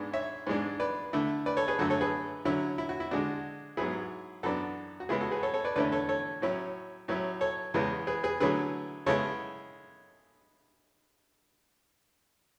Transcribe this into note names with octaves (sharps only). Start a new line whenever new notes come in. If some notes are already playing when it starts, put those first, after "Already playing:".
Already playing: G#2 G#3 B3 D4
C#5 E5
G#2 E3 G#3 D4
B4 D5
D3 A3 E4
B4 D5
A4 C#5
G#4 B4
F#2 D3 A3 F#4 A4
A4 C#5
G#4 B4
D3 F#3 C#4 E4
E4
F#4
E4
D3 G#3 D4 F#4
G#2 F#3 B3 E4 G#4
F#2 E3 B3 D4 F#4 A4
F#4
C#3 E3 G#3 B3 E4 G#4
F#4 A4
G#4 B4
A4 C#5
A4 C#5
B4 D5
E2 D3 A3 C#4 E4 B4 D5
A4 C#5
A4 C#5
A2 F#3 C#4 E4
A2 F#3 C#4 E4
A4 C#5
E2 C#3 E3 G#3 B3
G#4 B4
G#4 B4
D3 F#3 A3 C#4 E4 G#4 B4
C#3 G#3 B3 E4 A4 C#5